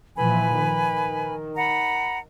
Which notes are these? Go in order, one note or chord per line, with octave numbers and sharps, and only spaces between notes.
A#2 E3 F3 B4 G#5 B5
D#3
F#5 A#5 B5